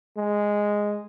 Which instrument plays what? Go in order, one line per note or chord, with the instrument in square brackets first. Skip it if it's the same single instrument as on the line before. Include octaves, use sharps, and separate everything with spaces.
[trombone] G#3